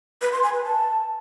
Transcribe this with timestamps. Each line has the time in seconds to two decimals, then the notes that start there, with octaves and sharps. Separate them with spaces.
0.22 B4
0.32 C6
0.43 G#5
0.53 B4
0.64 A5